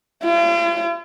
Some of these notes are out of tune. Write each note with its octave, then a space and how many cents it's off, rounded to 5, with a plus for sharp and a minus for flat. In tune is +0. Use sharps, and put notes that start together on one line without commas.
F4 -45